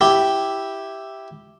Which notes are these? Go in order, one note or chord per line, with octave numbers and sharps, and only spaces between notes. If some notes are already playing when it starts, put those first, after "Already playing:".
E4 G4